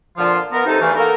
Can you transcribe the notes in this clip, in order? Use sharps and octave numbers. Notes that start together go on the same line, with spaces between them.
A#2 D3 F3 F4
B3 A#4
C3 D#4 A4
E2 G2 E3 A3 F5 G#5
A#3 B3 A4 A#4